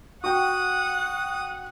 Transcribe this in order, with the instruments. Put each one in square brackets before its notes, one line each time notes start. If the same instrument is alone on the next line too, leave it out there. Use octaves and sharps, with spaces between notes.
[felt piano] F#4 G5 [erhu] F#5 [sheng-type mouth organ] D#6